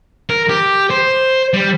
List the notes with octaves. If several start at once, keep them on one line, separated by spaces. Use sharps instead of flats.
A#4
G4
C5
G3